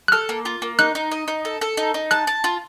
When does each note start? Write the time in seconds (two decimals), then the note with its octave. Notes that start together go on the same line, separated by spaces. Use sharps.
0.08 F#6
0.12 A4 F6
0.29 A#3
0.45 F4
0.62 A#3
0.79 D#4 F#6
0.95 D#4
1.11 D#5
1.28 D#4
1.45 A4
1.61 A4
1.77 D#4
1.94 D#4
2.11 A5 F#6
2.27 A5
2.44 F4